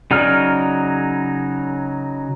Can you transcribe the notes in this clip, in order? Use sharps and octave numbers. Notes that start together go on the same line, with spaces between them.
C#3 F#3 D#4 D5 F6